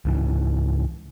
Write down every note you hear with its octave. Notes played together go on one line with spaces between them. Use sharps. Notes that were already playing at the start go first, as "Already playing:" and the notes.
C#2 G#2 C#3 E3